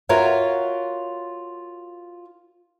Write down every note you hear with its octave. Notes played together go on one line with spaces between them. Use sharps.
F4 F#4 A#4 C#5 E5